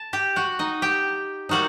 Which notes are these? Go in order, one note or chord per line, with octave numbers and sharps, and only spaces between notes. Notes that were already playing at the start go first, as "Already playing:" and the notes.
Already playing: A5
G4 G5
F#4 F#5
D#4 D#5
G4 G5
G3 A#3 D#4 F#4 F#5